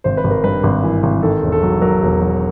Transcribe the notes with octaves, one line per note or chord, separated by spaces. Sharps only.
G#1 C5
B4
G#1
A#4
G2 B4
G#1
E3
G#1
D#3 A4
E1
A4
F#3
F#3 A#4
E1
F#3